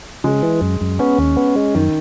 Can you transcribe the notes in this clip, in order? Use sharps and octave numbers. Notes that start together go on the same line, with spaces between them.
C#3 G#3
E3
F#2
F#2
B3 C#4
D#2
B3
G#3
F#2 D#3